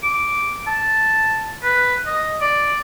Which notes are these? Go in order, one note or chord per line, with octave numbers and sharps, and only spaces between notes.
D6
A5
B4
D#5
D5